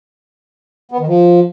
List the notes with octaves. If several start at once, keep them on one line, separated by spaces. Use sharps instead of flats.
B3
D#3
F3